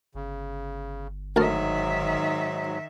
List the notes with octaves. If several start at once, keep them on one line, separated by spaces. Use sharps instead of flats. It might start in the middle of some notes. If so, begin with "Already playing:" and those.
G1 C#3
D2 G#2 D#3 F#3 A#4 E5 A5